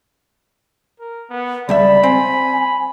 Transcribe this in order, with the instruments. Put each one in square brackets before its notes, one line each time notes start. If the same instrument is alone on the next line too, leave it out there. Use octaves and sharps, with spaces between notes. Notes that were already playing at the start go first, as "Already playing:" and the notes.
[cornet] A#4
B3
[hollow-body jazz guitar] C#2 G3 E5 [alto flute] D5 [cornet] B5
[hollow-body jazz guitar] C4 [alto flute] G#5